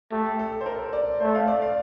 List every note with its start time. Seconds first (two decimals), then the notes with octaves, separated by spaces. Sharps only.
0.12 A3 G4
0.39 A4
0.61 C5
0.66 A#4
0.93 D5
1.20 A3 C5
1.35 F5
1.48 D5
1.62 F5